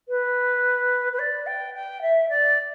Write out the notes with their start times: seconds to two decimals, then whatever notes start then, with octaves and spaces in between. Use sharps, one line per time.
0.08 B4
1.12 B4
1.18 D5
1.46 G5
1.74 G5
2.01 E5
2.29 D5